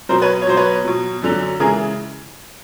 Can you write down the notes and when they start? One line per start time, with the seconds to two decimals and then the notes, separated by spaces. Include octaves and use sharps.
0.09 B2 F#3 A#4 C5
0.22 B4 C#5
0.42 C#5
0.47 B2 F#3 C5
0.57 B4 C#5
0.84 B2 F#3
1.22 F#2 D3 F#3
1.60 C#3 E3 G#3 G#4 A#4